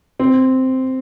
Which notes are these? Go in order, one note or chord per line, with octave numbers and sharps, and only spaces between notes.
C4